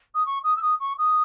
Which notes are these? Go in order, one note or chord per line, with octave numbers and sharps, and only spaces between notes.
D#6
C#6
D#6
E6
D#6
C#6
D#6